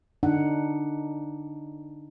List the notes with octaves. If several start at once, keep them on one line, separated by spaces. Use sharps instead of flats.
D3 D4 D#4 F#5